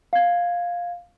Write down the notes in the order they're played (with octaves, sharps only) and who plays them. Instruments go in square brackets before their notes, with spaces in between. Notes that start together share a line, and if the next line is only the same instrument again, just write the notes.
[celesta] F5 G#6